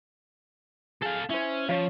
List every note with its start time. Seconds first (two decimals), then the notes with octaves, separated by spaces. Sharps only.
1.02 G#4 A4 F5
1.29 C#4 E4 C5
1.69 F3 C#4 C#5 F5